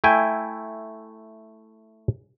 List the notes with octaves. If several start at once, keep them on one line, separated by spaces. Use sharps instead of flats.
A3 E4 G5 G#5